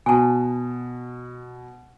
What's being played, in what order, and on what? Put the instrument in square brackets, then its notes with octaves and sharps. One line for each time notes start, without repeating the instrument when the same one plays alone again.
[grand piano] B2 [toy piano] G#5 A5